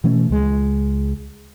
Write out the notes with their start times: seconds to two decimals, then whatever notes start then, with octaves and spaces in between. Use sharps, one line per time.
0.04 B2 E3 A3 C#4
0.30 C#2 G#3